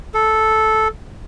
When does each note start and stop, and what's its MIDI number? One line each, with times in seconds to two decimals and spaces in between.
0.14 0.88 69